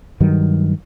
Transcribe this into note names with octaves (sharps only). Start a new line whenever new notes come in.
G2 D#3 F#3